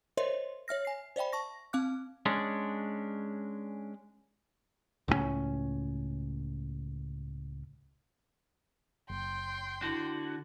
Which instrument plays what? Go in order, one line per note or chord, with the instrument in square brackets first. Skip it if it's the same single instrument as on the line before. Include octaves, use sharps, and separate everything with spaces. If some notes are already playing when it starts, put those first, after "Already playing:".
[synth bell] A#4 C5 C#5 D#5 E5 C6
C#5 E5 F6 A#6
G#5 C7
C5 D5 E5 G5 B5
A5 C#6 A#6
C4 F5 D6 F#6
[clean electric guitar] G#3 C#4 D4
[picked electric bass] C#2 A2 F#3 C#4
[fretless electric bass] F#1 [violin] G5 C6
[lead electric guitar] D3 F#4 [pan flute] E4